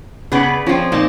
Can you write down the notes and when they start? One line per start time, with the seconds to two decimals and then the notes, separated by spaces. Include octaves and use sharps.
0.32 C#3 B3 G#4 B4 D5
0.66 F3 C4 C#4 F4
0.92 A#2 A#3 D#4 A5